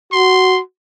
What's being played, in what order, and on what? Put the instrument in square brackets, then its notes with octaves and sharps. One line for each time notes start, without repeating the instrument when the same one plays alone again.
[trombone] F#4 [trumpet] C6